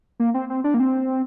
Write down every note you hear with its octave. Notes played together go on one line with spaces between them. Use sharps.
A#3
C4
C4
D4
A#3
C4